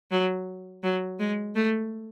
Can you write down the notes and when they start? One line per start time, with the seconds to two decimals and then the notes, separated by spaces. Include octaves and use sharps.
0.11 F#3
0.83 F#3
1.20 G#3
1.55 A3